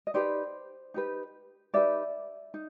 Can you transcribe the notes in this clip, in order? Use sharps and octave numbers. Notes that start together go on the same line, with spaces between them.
D#5
D#4 G4 B4 C5 D5
D#4 G4 B4
D#4 G4 B4 D5 E5
D#4